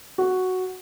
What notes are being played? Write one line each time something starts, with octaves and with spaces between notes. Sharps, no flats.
F#4